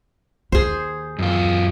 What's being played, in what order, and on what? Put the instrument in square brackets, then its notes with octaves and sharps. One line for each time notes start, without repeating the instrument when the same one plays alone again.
[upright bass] D#2 [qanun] G#4 C5
[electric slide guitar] F#2 F4